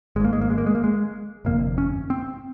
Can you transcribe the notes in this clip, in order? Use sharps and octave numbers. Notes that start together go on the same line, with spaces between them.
G#1 G#2 G#3 A#3
G#3
A#3
G#3
A#3
G#3
A#3
G#3
G1 F2 C3 A#3
C#4
C4